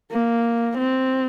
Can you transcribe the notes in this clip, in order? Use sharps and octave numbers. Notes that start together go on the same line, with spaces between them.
A#3
C4